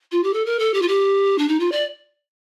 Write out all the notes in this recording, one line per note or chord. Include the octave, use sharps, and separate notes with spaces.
F4
G4
A4
A#4
A4
G4
F4
G4
D4
D#4
F4
D5